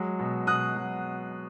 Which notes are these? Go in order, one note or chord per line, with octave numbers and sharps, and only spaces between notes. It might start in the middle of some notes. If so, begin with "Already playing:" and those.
Already playing: F#3 G#3
B2
B2 D#6 F#6
F#3